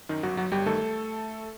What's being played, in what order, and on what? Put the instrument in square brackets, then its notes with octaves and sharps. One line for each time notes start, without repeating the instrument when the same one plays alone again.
[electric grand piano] F#2 D#3 D#4
G1 F#3 F#4
F#3 F#4
G1 G3 G4
D#3 A3 A4